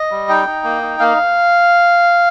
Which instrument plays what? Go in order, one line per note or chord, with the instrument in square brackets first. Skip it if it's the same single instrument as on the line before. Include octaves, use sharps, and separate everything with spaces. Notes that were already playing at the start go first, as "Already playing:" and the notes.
Already playing: [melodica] D#5
G3
D#4 G5
D#4
A#3
D#4
A#3 F5